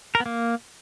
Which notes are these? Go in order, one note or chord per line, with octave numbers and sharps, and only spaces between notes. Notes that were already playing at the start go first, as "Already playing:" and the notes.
A#4
B3
A#3